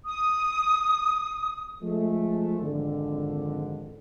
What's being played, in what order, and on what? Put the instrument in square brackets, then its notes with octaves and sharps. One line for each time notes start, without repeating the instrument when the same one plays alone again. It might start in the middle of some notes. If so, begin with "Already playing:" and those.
[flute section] D#6
[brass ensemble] F3 G#3 A3
G#1 F2 D3